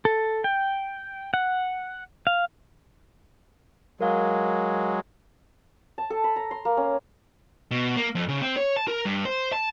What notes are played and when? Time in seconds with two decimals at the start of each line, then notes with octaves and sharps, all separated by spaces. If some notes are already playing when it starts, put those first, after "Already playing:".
0.05 A4
0.44 G5
1.34 F#5
2.27 F5
4.01 F#3 G#3 A#4 F5
5.98 A5
6.10 A4
6.24 B5
6.36 A#5
6.51 C6
6.65 A#3
6.77 C#4
7.71 B2
7.97 A#3
8.15 F2
8.29 C#3
8.42 C4
8.57 C#5
8.76 A5
8.88 A#4
9.05 G2
9.25 C5
9.53 A5